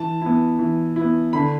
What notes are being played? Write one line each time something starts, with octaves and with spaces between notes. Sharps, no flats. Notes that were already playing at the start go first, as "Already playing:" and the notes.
Already playing: E3 A5
B3 E4
E3
E4
B3
D3 B5